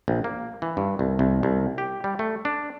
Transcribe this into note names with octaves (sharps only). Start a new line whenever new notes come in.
A#1
A#3
E3
G2
C2
C2
C2
G4
G3
A3
D4